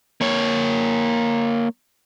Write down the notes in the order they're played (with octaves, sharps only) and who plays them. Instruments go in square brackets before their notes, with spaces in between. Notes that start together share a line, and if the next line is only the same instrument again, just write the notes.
[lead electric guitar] A#3 C#5